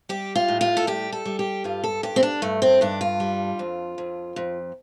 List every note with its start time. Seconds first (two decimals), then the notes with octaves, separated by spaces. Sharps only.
0.09 G3 G4
0.35 F4
0.48 A2
0.61 F4
0.77 A4
0.87 G3 G4
1.12 A4
1.25 G3
1.39 G4
1.64 G2 F4
1.84 A4
2.03 G2 G4
2.16 C4
2.23 D4
2.42 G2 A3
2.62 C4
2.81 G2 D4
3.01 F4
3.20 G3
3.59 F2
3.98 F2
4.36 F2